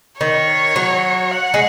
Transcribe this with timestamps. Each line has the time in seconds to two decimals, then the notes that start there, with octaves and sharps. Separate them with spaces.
0.20 D#3 C#5
0.76 F#3
1.31 F#5
1.54 G#3